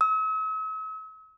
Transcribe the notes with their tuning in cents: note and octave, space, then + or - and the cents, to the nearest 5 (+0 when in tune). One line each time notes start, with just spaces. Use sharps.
E6 -45